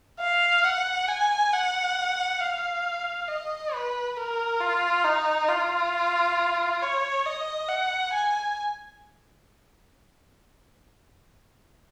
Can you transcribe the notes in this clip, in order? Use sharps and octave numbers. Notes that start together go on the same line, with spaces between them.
F5
F#5
G#5
F#5
F5
D#5
B4
A#4
F4
D#4
F4
C#5
D#5
F#5
G#5